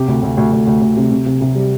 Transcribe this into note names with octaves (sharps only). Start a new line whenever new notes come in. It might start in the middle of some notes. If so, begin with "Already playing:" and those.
Already playing: C3 G4
D2
D2
D2
D2
D2
D2
C3
C3
C3
C3
G3